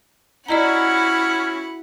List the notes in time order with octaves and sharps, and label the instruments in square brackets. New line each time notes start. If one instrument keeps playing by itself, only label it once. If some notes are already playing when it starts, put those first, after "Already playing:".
[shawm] C#4 [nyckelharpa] E4 F#4 [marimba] D5 D#5 A#5 [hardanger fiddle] F#5 B5